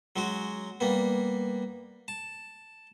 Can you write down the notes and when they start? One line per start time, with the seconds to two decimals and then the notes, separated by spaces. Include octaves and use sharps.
0.16 F#3 G#3 C#4 F#4
0.80 G3 A#3 B3
2.08 A5